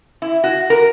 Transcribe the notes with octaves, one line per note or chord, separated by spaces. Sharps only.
E4
F#4
A#4